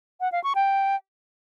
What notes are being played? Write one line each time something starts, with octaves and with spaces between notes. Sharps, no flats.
F#5
F5
C#6
G5